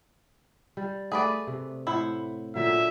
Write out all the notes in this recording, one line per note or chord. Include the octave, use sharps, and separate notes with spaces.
G3
A3 G#4 B4 D5
C3
A2 E4 C5 F#5
A#2 D3 F#3 E5